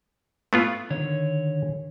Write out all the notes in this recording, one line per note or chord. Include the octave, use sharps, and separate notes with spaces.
A3 B3 F4
D3 D#3 C#5